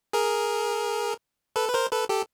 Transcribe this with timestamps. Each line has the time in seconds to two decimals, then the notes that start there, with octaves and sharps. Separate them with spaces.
0.13 G#4 A#4
1.56 A4 B4
1.69 B4
1.74 A#4 C5
1.92 A4 B4
2.09 G4 A4